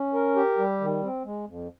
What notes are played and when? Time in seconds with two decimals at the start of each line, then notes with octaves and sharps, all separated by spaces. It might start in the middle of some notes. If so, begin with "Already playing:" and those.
Already playing: C#4
0.14 A#4
0.36 G4
0.58 G3
0.80 D#3
1.02 C4
1.25 G#3
1.47 F2